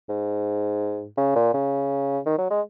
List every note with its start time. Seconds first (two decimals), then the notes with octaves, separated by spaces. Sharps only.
0.09 G#2
1.18 C#3
1.36 A#2
1.54 C#3
2.26 D#3
2.38 F#3
2.50 G#3